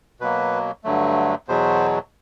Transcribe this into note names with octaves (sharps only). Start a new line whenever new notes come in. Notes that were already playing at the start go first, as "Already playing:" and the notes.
B2 F#3 A#3 B4
G2 D3 F#3 A3
E2 B2 F#3 C5